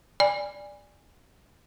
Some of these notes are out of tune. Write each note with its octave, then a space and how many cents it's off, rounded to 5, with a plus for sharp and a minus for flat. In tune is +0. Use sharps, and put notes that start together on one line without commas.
D5 +0 G#5 -20 B5 +0